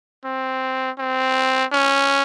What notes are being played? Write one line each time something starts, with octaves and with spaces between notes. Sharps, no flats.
C4
C4
C#4